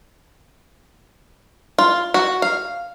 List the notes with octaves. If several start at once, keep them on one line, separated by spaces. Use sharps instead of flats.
F4
F#4
F5